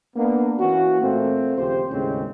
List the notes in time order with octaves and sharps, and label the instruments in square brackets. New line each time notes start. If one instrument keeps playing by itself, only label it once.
[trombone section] A#3 B3 D4
E3 A#3 C#4 F#4
A#2 A3 A#3 C4
D#2 C#3 F3 G4 C5
D#2 A2 C#3 G#3 C4 C#4